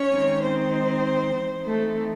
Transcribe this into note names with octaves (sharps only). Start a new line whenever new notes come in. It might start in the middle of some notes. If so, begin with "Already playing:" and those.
Already playing: C#4 C#5
D#3 G#3 C4 D#4
C4 C5
E3 C4 D#4
A3 A4